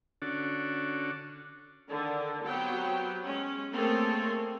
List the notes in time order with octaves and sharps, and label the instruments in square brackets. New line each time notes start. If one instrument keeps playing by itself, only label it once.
[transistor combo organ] D3 C#4 D4 F#4 A4
[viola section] D3 D#3
F#3 B3 C4 G4 G5
G#3 C#4
A3 A#3 C4 G#4 A4 C#5